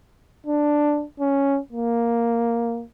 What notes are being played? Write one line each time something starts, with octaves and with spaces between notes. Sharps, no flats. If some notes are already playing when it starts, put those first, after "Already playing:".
D4
C#4
A#3